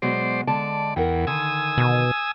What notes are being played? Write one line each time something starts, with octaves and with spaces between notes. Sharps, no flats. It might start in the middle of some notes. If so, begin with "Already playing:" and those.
B2 F#3 G#3 C5 D5
D3 G#3 D5 A5
E2 A#4 F#5 G5
D3 D#3 G#5 D#6 E6
B2